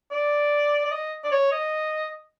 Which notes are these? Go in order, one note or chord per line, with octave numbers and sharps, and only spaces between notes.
D5
D5
D#5
D5
C#5
D#5